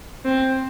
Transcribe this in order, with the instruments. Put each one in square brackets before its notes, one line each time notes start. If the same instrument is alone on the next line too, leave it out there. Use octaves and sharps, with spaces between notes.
[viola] C4